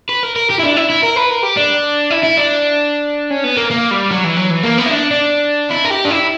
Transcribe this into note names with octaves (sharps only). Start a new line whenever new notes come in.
B4
A#4
A#4
G4
E4
D4
E4
E4
A#4
B4
A#4
G4
D4
E4
E4
D4
C#4
B3
A#3
A#3
G3
F#3
E3
F#3
E3
A#3
B3
E4
D4
D4
E4
A#4
G4
D4
E4